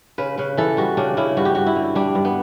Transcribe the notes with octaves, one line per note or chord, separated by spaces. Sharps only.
C#3 B4
C#3 B4
E3 A4
G3 F#4
C#3 D4
C#3 E4
G2 F#4
G4
G2 F#4
E4
D3
G3 D4
G2
B3